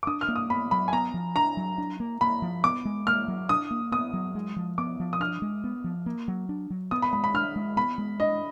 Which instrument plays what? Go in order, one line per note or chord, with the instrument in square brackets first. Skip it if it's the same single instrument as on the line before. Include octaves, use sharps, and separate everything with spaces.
[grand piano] D6
[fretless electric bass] D4 [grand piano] D#6
[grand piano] F6
[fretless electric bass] A#3
[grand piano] D#6
[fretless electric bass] B3 [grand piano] B5
[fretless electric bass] F#3 [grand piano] B5
[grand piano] G#5
[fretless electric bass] B3 [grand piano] A#5
[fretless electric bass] F3
[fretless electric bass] D4 [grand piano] A#5
[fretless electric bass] F#3
D4
A#3
[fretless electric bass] A#3 [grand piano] B5
[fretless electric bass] F3
[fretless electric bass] B3 [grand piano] D6
[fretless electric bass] G#3
[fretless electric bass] A#3 [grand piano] F6
[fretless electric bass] F#3
[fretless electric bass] D4 [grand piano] D#6
[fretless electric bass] A#3
[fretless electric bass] B3 [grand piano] D#6
[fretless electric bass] F#3
G#3
F3
[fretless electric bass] B3 [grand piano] D6
[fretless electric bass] F3
[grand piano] D#6
[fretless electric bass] D4 [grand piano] F6
[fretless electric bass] G#3
B3
F3
A#3
F#3
D4
F#3
[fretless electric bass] B3 [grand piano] D#6
[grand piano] B5
[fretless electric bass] G#3 [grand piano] B5
[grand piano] B5
[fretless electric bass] D4 [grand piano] F6
[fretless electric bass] G#3
[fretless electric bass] B3 [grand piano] B5
[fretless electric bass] G#3
[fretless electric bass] D4 [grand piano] D#5